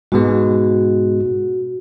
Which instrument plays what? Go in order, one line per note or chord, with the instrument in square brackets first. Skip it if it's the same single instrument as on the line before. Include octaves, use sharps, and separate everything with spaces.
[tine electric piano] G#2 B2 G#3 [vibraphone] F#4